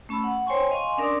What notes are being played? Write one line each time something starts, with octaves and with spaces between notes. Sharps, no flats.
A3 C#4 A5 B5 E6
F#5
C5 C#5 G5 G#5 C6 C#6
D#5 F5 G#5 C6 C#6
C#4 D4 A#4 D5 C6 D#6